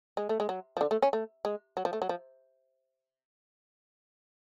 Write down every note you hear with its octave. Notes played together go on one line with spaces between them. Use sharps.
G#3
A3
G#3
F#3
F3
D3
A3
C#4
A3
G#3
F#3
F3
A3
F#3
F3